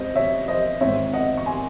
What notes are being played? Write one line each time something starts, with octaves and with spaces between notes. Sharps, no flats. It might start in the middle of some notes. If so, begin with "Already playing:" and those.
Already playing: C#2 C4 C5 D#5
C#5 E5
C5 D#5
G#1 G#2 E3 C4 C#5 E5
D#5 F#5
C#6
G#5 C6